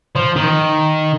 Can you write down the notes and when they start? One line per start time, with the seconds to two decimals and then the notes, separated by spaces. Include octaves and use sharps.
0.16 F3
0.36 D#3